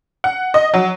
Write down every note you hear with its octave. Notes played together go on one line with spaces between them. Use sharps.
F#5
D#5
F#3